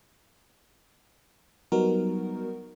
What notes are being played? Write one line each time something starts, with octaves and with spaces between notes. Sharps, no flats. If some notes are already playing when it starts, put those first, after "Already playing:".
F#3 G3 B3 D#4 F#4 A#4